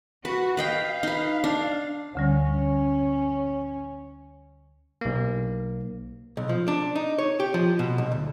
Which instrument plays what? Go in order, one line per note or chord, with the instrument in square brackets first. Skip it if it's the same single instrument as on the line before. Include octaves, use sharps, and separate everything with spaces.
[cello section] F#4 [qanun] B4
[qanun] B4 D#5 G5 [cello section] F5
[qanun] D#4 B4
D4
[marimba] D2 D3 G3 [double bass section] C#4
[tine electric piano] B1 A#3
[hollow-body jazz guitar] B1
F3
D4
D#4
C#5
G4
F3
B2
B1
D2